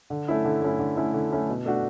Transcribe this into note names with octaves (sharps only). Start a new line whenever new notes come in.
D3
A3 C#4 E4
D3
A3 C#4 E4
D3
A3 C#4 E4
D3
A3 C#4 E4
B2
A3 D4 F#4